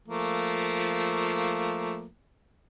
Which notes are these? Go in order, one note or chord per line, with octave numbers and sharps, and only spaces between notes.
F3 A3 A#3